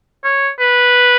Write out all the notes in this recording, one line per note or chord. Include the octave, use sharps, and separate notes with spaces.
C#5
B4